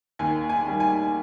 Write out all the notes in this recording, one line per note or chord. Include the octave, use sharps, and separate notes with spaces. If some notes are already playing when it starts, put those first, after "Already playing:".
D#2 G#5
G#5
D#3 G3
G#5